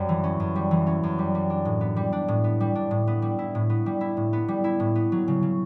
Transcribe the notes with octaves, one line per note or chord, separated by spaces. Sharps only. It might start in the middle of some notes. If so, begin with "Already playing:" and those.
Already playing: F#2 G3
E3
C#4
F#2
G3
E3
C#4
F#2
G3
G3
D4
A2
B3
G3
D4
A2
B3
G3
D4
A2
B3
G3
E4
A2
B3
G3
E4
A2
B3
G3
E4
A2
B3
F#3
C#3
C#3